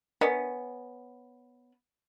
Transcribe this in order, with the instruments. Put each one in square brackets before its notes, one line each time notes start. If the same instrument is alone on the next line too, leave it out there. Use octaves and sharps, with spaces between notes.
[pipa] B3 C#4 [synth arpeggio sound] D4 A#4 D#5